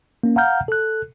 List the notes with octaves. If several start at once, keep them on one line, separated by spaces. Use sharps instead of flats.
A#3 C#4
F5 F#5 A#5 F6 G6
A4 F#6